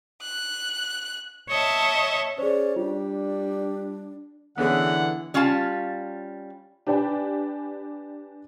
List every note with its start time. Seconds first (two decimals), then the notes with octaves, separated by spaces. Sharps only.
0.21 F#6
1.49 C#5 D#5 E5 A5
2.38 C#4 G#4 C5 D5
2.76 G3 D4 F4
4.58 D3 E3 B3 C#4 G#4 F#5
5.34 G3 C#4 F4 F5 A5
6.87 D4 G4 B4 D5 G5 G#5